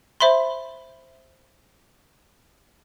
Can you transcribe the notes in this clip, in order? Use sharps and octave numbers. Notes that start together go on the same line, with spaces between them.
C5 E5 B5 C6